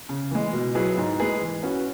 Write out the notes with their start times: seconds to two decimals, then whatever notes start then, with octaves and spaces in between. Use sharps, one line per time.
0.09 C#3
0.31 E3 G#3
0.53 B2
0.75 F#3 E4 G#4 B4
0.98 G#2
1.20 G#3 E4 G#4 B4
1.41 E3
1.63 C#4 F#4 B4